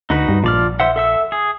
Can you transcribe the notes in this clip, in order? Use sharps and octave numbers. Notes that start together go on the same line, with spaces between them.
D2 D#4 F#4 B4
G2
A#1 F3 D5 F6
C5 E5 F#5
A4 E5 E6
G#4